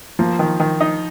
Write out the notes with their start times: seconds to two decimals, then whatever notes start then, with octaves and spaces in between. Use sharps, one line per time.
0.19 F3 A#3
0.39 D#3
0.60 D#3
0.80 D#4